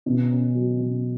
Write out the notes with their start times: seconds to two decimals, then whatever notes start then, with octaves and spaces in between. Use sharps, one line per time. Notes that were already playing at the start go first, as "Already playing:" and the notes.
0.06 B2
0.30 C#4
0.55 F#3
0.79 B2